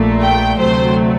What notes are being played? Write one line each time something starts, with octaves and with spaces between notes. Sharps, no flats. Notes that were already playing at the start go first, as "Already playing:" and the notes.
Already playing: A#1 A#2 A3
G5
D2 C3 F#3 A3 C5